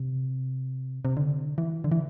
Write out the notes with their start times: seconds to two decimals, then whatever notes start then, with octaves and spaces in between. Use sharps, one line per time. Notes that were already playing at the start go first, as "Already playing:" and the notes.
Already playing: C3
1.05 C3
1.17 D3
1.58 E3
1.84 D3
1.92 E3